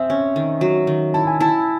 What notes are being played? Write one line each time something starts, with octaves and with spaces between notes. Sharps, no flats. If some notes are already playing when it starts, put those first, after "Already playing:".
Already playing: C4 G#4 E5
C#4
D#3
F#3
D#3
E4 A5
G#5
E4 A5